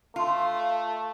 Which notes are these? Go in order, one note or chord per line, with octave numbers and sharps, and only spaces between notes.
A3 F4 F5